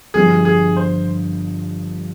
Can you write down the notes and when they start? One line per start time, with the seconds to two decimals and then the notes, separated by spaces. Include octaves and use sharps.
0.14 G1 G2 F3 B3 G#4
0.45 G#4
0.77 C5